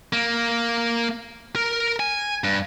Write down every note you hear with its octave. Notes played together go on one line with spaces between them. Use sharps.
A#3
A#4
G#5
G2